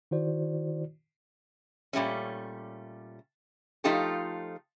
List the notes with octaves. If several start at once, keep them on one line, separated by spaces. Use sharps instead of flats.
D#3 E4 F#4 C5 D5
A#2 G3 A3 C#4
F3 A3 D#4 F4 G4 A4